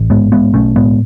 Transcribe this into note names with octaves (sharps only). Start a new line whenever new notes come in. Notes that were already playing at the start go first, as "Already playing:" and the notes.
Already playing: A1
G#2 G#3 B3
A1 G#3 B3
B1 A3 C#4
A2 G#3 B3